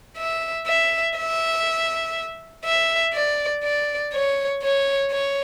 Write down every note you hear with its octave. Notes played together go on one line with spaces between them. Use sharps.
E5
E5
E5
E5
D5
D5
C#5
C#5
C#5